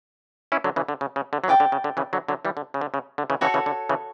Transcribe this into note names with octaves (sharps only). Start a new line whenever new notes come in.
C#4 E4
D3 F#3
C#3 E3
D3
C#3
C#3
D3
F#3
C#3 E3 D5 G5 D6
D3
C#3
D3
C#3 E3
D3 F#3
D3 F#3
E3 G3
D3
C#3
D3
C#3
D3
C#3 E3
C#3 E3 F#4 A4 C#5 F#5
C#3 E3
D3
C#3 E3